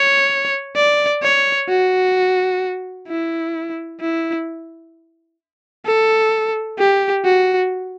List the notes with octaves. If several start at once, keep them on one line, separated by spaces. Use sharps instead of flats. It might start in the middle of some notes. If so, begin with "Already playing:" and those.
Already playing: C#5
D5
C#5
F#4
E4
E4
A4
G4
F#4